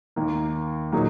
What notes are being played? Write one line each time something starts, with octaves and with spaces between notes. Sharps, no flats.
D#2 D#3 A#3
A#2 F#3 A#3 D#4 G#4